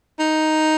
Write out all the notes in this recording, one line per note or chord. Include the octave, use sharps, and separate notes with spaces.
D#4